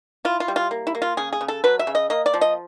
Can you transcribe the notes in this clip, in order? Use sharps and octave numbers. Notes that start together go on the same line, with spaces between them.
E4 F4
F4
G3
F4
A#3
E4
A#3
F4
C#3 G#4
G#4
C#3
A4
F#3 B4
E5
C#3
D#5
A#3 D#5
D5
F3
D#5